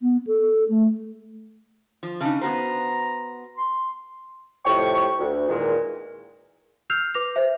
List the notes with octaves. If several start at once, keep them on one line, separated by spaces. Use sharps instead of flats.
B3
A4
A3
F3
C#3 D4 D#4
B3 F#4 C5 A#5
C6
F2 A2 C3 G4 G5 C#6
D2
E2 A#2 D#3 G#3
E6 F6 G6 C7 F7
B4 D6 A#6 F7
C5 E5